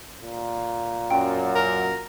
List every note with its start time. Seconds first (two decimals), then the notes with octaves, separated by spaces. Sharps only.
0.22 A#2
1.11 F#2 G5
1.55 A#4